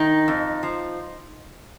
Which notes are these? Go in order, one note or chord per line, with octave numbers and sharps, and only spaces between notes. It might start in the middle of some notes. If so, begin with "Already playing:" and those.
Already playing: D#3 D#4
F2
F3